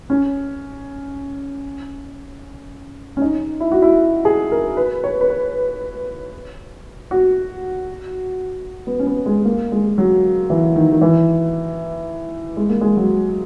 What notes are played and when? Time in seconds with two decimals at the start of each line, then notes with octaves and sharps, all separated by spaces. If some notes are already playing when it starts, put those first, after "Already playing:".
0.10 C#4
3.17 C#4
3.22 D#4
3.60 E4
3.72 F#4
3.82 E4
4.25 G#4
4.52 A#4
4.77 B4
5.04 C#5
5.21 B4
5.30 C#5
7.11 F#4
8.87 B3
9.00 C#4
9.06 B3
9.26 G#3
9.45 A#3
9.72 G#3
9.98 F#3
10.50 E3
10.76 D#3
10.91 D#3
11.01 E3
12.57 G#3
12.69 A#3
12.81 G#3
12.97 F#3